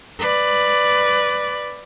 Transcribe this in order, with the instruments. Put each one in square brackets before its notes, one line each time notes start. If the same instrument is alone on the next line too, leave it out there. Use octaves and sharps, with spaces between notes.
[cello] B4 D5